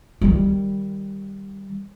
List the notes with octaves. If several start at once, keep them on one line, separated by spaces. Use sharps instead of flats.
D#3 G3